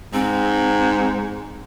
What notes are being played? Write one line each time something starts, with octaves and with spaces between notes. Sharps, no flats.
G#2 C4